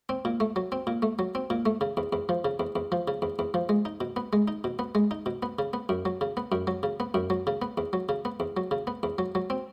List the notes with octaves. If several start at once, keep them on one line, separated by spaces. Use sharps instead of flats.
C4
A#2
A3
F#3
C4
A#2
A3
F#3
C4
A#2
A3
C#3
E2
E2
F3
C#3
E2
E2
F3
C#3
E2
E2
F3
G#3
D#4
B2
B3
G#3
D#4
B2
B3
G#3
D#4
B2
B3
C#3
B3
F#2
F#3
C#3
B3
F#2
F#3
C#3
B3
F#2
F#3
C#3
B3
E2
F#3
C#3
B3
E2
F#3
C#3
B3
E2
F#3
F#3
C4